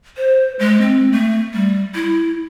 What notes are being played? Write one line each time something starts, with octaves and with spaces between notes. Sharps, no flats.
C5
G#3
C4
A3
G3
E4